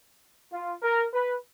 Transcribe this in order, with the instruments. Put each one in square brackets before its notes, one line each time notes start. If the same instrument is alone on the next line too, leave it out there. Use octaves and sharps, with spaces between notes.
[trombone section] F4
A#4
B4